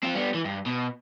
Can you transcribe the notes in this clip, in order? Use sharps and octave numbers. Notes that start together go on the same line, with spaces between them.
C4 F4
G3 B3
E3
G2
B2